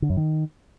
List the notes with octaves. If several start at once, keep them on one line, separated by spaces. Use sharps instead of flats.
D3
F#2
D#3